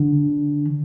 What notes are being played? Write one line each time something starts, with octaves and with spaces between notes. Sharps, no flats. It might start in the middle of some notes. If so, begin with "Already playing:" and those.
Already playing: D3